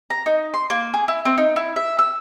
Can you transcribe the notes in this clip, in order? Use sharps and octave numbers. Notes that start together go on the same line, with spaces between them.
A#5
D#4
C6
A#3
G#4
E4
C4
D#4
E4
E5
E6